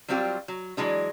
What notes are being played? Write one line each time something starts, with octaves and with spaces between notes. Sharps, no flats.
F#3 G3 C4 F4 G4
F#3
E3 F#3 G#3 D4